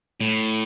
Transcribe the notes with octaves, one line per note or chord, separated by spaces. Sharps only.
A2